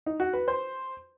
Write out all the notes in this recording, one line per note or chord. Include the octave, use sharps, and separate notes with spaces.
D#4
F#4
B4
C5